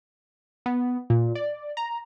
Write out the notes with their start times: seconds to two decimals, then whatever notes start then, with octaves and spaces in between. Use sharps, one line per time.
0.66 B3
1.10 A#2
1.35 D5
1.77 A#5